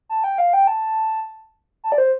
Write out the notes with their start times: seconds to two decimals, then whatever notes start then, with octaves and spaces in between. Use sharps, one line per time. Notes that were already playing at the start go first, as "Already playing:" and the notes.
0.09 A5
0.24 G5
0.38 F5
0.53 G5
0.67 A5
1.84 A5
1.92 D5
1.98 C5